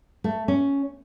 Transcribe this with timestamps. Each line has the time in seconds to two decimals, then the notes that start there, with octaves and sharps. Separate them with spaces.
0.24 A3
0.48 C#4